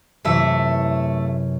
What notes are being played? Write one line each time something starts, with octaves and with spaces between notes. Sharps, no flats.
F#2 C3 E3 A3 E5